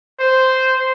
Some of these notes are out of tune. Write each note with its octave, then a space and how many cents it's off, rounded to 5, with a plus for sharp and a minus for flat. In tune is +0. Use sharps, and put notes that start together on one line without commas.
C5 -5